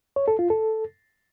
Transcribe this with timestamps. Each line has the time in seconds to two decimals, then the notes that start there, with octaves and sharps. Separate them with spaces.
0.16 C#5
0.28 A4
0.39 F4
0.50 A4